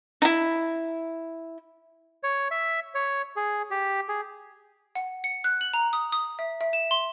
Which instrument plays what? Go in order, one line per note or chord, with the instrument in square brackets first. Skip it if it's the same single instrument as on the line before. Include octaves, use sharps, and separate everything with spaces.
[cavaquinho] D#4 E4
[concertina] C#5
E5
C#5
G#4
G4
G#4
[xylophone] F#5
C#7
F#6
F#7
A#5
D#6
D#6
E5
E5
E7
C6